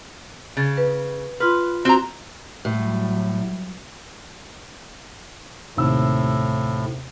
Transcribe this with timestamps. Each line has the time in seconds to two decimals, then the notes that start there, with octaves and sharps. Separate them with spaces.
0.57 C#3 A6
0.77 B4
1.40 F4 B4 C6 F6
1.85 C4 F#4 A#5
2.65 A2 F#3 G3
5.77 D#2 A2 C3 E6